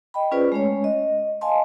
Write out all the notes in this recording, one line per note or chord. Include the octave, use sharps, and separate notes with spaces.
D#5 G5 B5
C#4 F4 G#4 B4 C5 D5
G#3 A3 C#4 C#5
D#5
D#5 F5 G#5 A5 C6